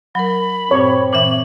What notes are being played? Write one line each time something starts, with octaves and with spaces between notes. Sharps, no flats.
F#3 A#4 B5
G2 A#2 C4 C#5
A#2 E3 E5 F#7